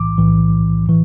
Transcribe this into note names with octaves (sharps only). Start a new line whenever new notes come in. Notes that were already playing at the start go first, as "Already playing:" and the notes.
Already playing: B1 A2 E3 D6
B1 A2 E3
A2 E3